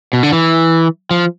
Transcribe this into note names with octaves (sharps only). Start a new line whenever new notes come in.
B2
D3
E3
F3